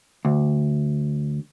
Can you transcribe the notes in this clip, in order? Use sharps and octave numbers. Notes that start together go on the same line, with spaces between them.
D2